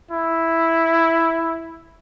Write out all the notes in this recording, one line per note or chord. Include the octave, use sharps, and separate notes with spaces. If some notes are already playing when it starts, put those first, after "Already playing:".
E4